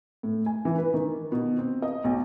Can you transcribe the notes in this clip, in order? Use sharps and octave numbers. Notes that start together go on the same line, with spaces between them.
A2
G#5
E3
B4
D#3
B2
C4
D#5
B1